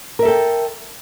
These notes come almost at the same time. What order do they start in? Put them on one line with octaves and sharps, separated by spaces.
A#4 E5 A4 G5